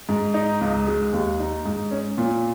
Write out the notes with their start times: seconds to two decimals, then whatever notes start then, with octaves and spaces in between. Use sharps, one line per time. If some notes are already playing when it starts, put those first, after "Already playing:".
0.09 G#2
0.34 D#4
0.61 C#2
0.87 G#3
1.13 D#2
1.39 D#4
1.65 G#2
1.91 C#4
2.18 A#2